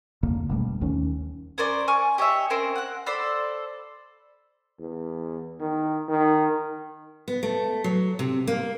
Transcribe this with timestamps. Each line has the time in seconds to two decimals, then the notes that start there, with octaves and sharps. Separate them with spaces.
0.23 D1 F2 D3 A#3
0.49 F#1 B2 G3 A3
0.81 D#2 D#3 C#4
1.58 C#4 A#4 C5 D5
1.88 G#5 C#6 F6
2.18 G4 C#5 D#5 E5
2.50 C4 C#4 A#4 C5
2.76 F#5 F#6
3.06 A4 C5 D5 B5
4.79 E2
5.60 D#3
6.08 D#3
7.28 B3
7.43 A3
7.84 F#3
8.19 C3
8.47 A#3